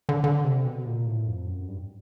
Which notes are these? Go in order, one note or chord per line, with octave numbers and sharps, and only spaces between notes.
D3
D3
C3
B2
A#2
A2
F2
F#2
G2